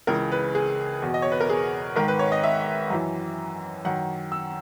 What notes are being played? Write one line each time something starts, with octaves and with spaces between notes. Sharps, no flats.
C#2 C#3 E3 A#4
B4
G#4
E2 B2
D#5
C#5
B4
A#4
G#4
G#2 D#3 A#4
B4
C#5
D#5
E5
F#2 E3
F#2 D#3 F#5
E6